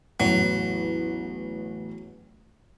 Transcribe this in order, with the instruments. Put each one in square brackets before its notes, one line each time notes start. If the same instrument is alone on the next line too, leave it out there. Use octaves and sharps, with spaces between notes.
[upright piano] A1 E2 [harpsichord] F#3